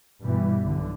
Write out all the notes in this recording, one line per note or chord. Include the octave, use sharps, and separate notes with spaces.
G2 B2 E3 G3
B1 D3